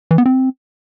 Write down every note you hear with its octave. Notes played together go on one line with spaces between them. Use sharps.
E3
B3
C4